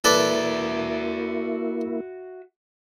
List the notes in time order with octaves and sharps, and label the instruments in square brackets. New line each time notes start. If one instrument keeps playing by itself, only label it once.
[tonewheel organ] A#3 E4 [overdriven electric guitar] F#4 E5 [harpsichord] A4 B4 D5